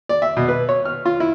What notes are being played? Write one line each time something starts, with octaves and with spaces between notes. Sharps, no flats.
D5
E5
B2
B4
C#5
F6
F4
E4